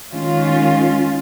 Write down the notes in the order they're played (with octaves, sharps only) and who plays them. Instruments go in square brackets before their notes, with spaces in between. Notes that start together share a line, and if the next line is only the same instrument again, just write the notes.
[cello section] D#3 G#3 C#4 F4